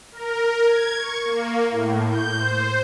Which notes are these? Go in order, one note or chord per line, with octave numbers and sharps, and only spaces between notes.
A#4
G#6
C#6
A#3
A2
G6
C5